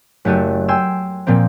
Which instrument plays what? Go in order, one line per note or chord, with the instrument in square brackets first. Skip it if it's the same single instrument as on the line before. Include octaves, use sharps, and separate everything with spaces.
[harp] F#1 A3 F#4 G4 A4 D#7
G5 G#5 C6 E6
A#2 F3 A#3 C4